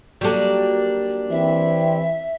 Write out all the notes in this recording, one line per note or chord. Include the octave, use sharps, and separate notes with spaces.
F#3 G3 A#3 D4 A4
E3 C4 E5